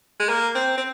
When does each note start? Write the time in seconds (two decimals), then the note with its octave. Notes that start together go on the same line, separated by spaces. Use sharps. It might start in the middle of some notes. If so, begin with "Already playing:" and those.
0.20 G#3
0.29 A#3
0.55 C4
0.77 C4